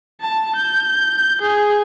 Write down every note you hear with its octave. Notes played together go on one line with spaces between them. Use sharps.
A5
G6
G#4